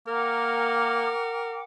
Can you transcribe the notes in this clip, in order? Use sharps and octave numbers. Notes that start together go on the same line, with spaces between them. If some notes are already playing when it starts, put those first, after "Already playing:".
A#3 A#4 F#5 G5 D6